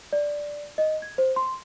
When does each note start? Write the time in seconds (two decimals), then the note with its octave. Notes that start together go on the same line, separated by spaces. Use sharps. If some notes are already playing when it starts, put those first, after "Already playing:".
0.13 D5
0.78 D#5
1.02 G#6
1.18 C5
1.36 C6